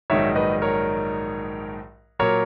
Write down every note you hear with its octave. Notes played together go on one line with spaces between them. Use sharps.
A#1 G#2 D#3 F#3 C#5 E5
B4 D#5
A#4 C#5
A#2 F#3 A#4 C#5